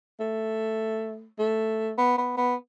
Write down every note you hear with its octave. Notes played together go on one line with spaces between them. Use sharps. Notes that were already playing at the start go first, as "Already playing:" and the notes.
A3
A3
B3
B3
B3